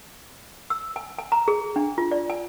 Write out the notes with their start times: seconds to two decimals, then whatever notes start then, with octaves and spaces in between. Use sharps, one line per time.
0.70 E6
0.96 G#5
1.19 G#5
1.32 A#5
1.48 G#4
1.76 D4
1.98 F4
2.11 D5
2.30 G#5